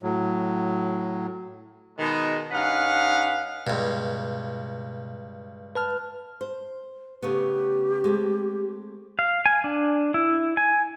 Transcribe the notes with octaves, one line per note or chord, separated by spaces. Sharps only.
A2 F#3
B2 D#3 G#3
G2 C#4 D#4 B4 F5 F#5
C#2 G2 B2
B4 A5 F6
C5
C#3 A3 B3 G4
G#3 A3 C4
F5
G#5
D4
E4
G#5